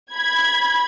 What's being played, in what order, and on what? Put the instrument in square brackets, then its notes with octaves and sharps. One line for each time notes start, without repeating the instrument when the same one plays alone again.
[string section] B5 G#6